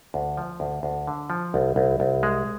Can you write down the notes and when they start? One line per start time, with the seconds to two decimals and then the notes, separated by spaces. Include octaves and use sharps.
0.14 D2
0.37 F3
0.60 D2
0.83 D2
1.07 D3
1.30 F3
1.54 C2
1.76 C2
2.00 C2
2.23 G#3